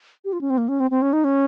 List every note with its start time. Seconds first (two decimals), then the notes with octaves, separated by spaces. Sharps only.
0.25 G4
0.33 F4
0.41 C#4
0.50 C4
0.58 A#3
0.68 C#4
0.80 C4
0.91 C4
1.02 C#4
1.13 D#4
1.24 C#4